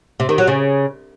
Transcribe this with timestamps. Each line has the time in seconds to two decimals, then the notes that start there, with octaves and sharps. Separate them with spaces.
0.20 C3
0.29 D#3
0.38 F#3
0.47 C#3